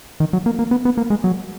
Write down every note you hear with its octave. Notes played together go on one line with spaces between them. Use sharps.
D#3
F#3
A#3
A#3
B3
B3
A#3
G#3
F#3